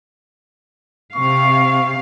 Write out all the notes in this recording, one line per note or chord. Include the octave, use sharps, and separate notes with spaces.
C3 F5 C#6